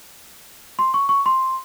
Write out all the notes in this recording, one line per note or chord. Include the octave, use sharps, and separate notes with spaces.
C6
C#6
C#6
C6